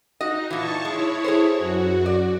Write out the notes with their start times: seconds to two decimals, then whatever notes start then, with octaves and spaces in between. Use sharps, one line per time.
0.21 D#4 F#4 D#5
0.50 A#2 E3 A5 C#6
0.85 G#3 E4 C#5
1.24 G#4 A4 C5
1.54 F#2 F#4
2.06 D5